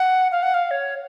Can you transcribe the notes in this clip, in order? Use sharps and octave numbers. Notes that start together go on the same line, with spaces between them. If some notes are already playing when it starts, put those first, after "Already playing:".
Already playing: F#5
F5
F#5
F5
C#5